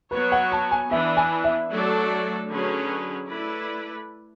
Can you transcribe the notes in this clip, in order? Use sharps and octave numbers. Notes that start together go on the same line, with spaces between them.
F#3 B3 F#4 B4 C#5
F#5
A5
G#5
E3 B3 D4 E5
G#5
E5
F#3 A3 D4 A4 D5
D3 F#3 C#4 G#4 B4
A3 E4 B4 D5